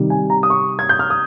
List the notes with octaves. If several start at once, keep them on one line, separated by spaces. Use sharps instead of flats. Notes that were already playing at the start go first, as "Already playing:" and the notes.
Already playing: C3 D#3 G3
G#5
A#5
D#6
C#6
G#6
G6
F6
D#6